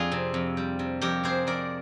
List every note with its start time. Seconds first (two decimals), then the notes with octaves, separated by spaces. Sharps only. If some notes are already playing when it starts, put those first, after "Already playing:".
Already playing: F2 D4 F4 G#4
0.12 C3
0.34 F2
0.57 G3
0.79 C3
1.01 F2 G4 A#4
1.24 C3 G#4 C5
1.47 F2 A#4 D5